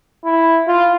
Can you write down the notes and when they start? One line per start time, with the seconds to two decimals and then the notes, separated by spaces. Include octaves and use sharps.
0.24 E4
0.67 F4